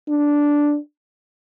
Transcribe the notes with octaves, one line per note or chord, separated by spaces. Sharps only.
D4